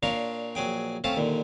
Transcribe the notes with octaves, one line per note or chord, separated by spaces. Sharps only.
A#2 D4 C#5 F5 A#5 C6
A#1 F#3 G#4 G5
A3 C4 C#4 F5 A5
D#2 A#2 D3